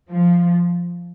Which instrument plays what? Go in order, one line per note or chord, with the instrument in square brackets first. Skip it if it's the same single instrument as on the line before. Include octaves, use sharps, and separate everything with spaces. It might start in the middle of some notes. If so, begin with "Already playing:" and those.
[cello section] F3